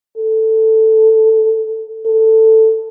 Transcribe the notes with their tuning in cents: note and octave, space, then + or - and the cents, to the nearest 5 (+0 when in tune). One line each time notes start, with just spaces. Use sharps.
A4 +5
A4 +10